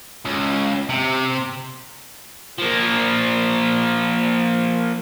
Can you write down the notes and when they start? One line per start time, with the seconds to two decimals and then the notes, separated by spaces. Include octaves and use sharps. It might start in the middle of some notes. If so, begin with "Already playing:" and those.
0.25 C#2
0.89 C3
2.59 F3 A#3